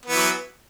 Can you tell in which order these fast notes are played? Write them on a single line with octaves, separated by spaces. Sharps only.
B3 E3 F#3